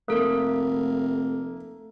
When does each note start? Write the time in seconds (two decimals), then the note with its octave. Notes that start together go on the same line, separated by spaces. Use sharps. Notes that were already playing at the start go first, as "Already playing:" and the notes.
0.08 F1 A3 A#3 A4